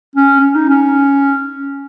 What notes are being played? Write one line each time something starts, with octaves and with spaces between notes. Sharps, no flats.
C#4
C#4
D#4
C#4